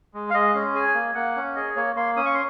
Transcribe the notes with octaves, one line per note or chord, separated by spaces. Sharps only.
G#3
F5
G#3 D#5
C#4
G#4 G#5
A#3
A#3 F#5
C#4
G#4 D#5
A#3 C#5
A#3 C6
C#4 D#6
C#6
C6